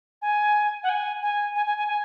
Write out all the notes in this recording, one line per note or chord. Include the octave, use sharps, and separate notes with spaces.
G#5
F#5
G#5
G#5
G#5
G#5
G#5
G#5